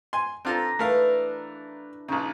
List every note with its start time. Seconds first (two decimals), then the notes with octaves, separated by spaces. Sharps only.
0.13 G#5 C6
0.45 C4 D4 F4 A4 A#5
0.79 E3 A3 A#4 F5
2.08 A#1 C#3 D#4